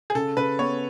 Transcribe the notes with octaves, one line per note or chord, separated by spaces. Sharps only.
G#4
C#3 A4
C#3 B4
B3 C#5